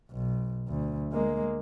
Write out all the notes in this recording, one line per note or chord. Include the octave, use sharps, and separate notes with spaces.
B1
D2
G#3 A#3